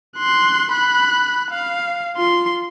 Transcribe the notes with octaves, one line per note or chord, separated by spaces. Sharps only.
C6 F#6
B5 F#6
F5
F4 C6